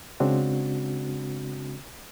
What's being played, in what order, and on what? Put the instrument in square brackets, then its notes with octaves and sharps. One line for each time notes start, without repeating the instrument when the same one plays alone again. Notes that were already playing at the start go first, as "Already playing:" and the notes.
[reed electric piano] C#3 G#3 C4 D4 F#4